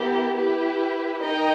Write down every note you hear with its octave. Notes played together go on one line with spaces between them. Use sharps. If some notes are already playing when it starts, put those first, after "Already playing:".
Already playing: B3 E4 G4 A#4
E4 G4 B4
D#4 A#4 D#5 G5